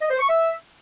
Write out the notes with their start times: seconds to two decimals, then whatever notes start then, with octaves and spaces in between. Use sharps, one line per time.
0.01 D#5
0.10 C5
0.19 C#6
0.29 E5